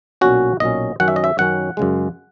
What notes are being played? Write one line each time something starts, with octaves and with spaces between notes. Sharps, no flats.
B1 A#2 F#3 C#4 F#4
B1 A#2 F#3 C#4 D#5
F#2 D#3 F#3 C#4 F#5
E5
D#5
E5
F#2 D#3 F#3 C#4 F#5
F#2 C#3 G#3